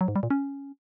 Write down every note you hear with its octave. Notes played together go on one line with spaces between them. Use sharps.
F#3
G#2
G3
A#2
C#4